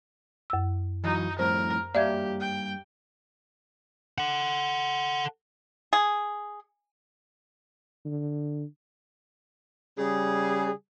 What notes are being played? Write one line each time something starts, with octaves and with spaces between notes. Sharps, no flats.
F#2 E6
E3 F#3 D#4
F2 A2 G3 A#4 C5
G2 A#3 G4 D5 E5 F5 G#6
G5
A4 F#5
G#4
D3
C#3 G3 G#4